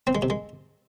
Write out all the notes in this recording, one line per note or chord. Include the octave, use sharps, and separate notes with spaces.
C4
G#3
C3
G#3